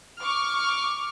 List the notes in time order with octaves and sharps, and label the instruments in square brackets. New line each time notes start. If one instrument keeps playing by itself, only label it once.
[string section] C#6 D6 F6